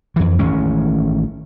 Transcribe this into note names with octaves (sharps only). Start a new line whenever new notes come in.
F2 E3
A1 D#3 G#3 C#4